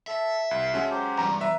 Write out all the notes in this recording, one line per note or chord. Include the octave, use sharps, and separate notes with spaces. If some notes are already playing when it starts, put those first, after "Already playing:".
A4 E5
C2 F5
G#3 C#4 F#4 A4
F#3 G4 C5
E2 G2 A#5
B4 E5